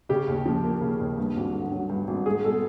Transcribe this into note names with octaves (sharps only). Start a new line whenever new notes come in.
C#3 G4
D#2
F3
A#3
C#3
D#2
G2
G#1
D3
F#3
G2
G#1
G#3 G#4
B2 A4